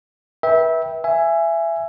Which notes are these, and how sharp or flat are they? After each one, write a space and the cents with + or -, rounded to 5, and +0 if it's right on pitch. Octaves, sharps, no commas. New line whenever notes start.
B4 -30 E5 -20 G5 +5
E5 +20 G#5 +0